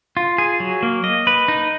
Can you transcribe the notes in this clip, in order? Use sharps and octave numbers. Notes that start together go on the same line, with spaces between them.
F4
G#4
F#3
A#3
D#5
B4
D#4